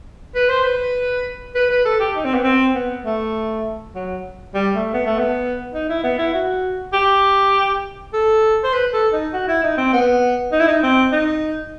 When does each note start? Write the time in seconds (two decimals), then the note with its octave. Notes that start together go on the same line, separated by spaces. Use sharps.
0.35 B4
0.50 C5
0.64 B4
1.55 B4
1.71 B4
1.85 A4
2.00 G4
2.16 D#4
2.25 C4
2.34 B3
2.44 C4
2.75 B3
3.05 A3
3.95 F#3
4.55 G3
4.75 A3
4.94 B3
5.06 A3
5.19 B3
5.74 D#4
5.89 E4
6.04 B3
6.19 E4
6.34 F#4
6.93 G4
8.13 A4
8.64 C5
8.73 B4
8.93 A4
9.13 D#4
9.33 F#4
9.48 E4
9.63 D#4
9.78 C4
9.93 B3
10.52 D#4
10.60 E4
10.68 D#4
10.83 C4
11.12 D#4